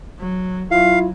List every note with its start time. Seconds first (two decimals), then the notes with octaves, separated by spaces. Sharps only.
0.19 F#3
0.71 F#3 E4 F4 F5